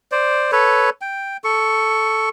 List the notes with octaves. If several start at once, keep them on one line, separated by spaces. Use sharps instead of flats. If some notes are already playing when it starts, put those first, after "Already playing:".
C5 D5
A4 B4 C#5
G5
A4 C#6